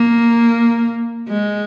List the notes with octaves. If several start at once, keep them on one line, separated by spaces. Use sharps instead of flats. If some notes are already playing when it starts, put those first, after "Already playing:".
Already playing: A#3
G#3